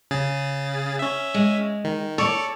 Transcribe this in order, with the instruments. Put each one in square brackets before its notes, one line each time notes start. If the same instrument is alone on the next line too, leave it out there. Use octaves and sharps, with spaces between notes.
[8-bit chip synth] C#3 G#4 A6
C#4 E5
[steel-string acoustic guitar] G#3
[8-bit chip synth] D#3
[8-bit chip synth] A4 D5 [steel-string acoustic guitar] C#5